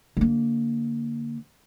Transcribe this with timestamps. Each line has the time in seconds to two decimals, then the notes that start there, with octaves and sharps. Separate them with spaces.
0.17 D3 A#3